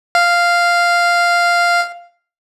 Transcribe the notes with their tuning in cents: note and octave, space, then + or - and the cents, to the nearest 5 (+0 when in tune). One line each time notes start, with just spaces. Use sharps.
F5 -5